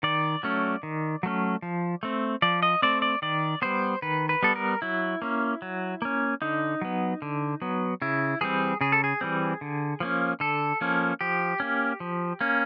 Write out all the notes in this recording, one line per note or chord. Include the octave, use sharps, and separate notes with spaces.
D#3 D5
F#3 A3 C#4
D#3
F#3 A3 C#4
F3
A3 C4
F3 D5
D#5
A3 C4 D5
D5
D#3 D5
G3 B3 C5
D#3 B4
B4
G3 B3 A4
A#4
F#3 E4
A#3 C#4
F#3
A#3 C#4
D3 D#4
F#3 B3
D3
F#3 B3
C#3 E4
E3 G3 C4 G#4
C#3 G#4
A4
G#4
E3 G3 C4
D3
F3 A#3 C#4
D3 A4
F3 A#3 C#4
F3 G4
A#3 C#4
F3
A#3 C#4